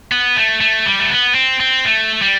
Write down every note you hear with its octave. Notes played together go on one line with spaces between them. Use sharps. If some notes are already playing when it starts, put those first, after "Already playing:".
B3
A3
A3
G3
A3
B3
C4
C4
A3
G3